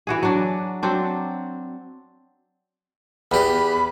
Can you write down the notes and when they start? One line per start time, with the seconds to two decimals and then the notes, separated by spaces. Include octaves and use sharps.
0.07 E3 F#4 G#4
0.23 F#3 D4
0.83 F#3 C4 D4
3.32 E2 G4 B5